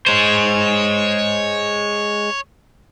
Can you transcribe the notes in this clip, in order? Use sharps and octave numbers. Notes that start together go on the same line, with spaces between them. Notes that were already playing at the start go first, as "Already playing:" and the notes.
G#3 C5 C#5